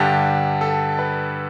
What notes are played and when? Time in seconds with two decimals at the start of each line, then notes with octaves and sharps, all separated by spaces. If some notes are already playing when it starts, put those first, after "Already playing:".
Already playing: G2 D3 G4
0.61 A4
0.99 B4